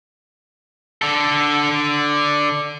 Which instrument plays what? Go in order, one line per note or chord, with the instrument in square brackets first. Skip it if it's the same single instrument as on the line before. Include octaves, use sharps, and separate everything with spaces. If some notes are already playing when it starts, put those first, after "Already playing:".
[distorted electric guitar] D3 A4